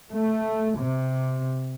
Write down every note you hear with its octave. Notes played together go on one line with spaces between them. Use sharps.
A3
C3